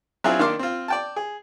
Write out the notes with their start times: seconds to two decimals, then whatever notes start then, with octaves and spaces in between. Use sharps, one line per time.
0.24 F#3 C4 D4 E4 F4 G#4
0.39 D#3 A#3 D4 C6 D6 F6
0.59 C4 F4
0.88 D5 G5 A5
1.16 G#4